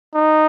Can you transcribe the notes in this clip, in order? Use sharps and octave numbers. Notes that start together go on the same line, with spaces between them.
D#4